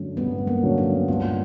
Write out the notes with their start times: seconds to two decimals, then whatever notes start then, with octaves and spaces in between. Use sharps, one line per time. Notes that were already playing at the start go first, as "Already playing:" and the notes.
Already playing: G2 D3 F#3 A3 C#4
0.17 G2 B3
0.47 A#3
0.63 D3 F#3 A3 C#4
0.78 B3
1.08 G2 F4